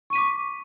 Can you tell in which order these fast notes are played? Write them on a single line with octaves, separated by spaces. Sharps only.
C#6 D#7 B6 D6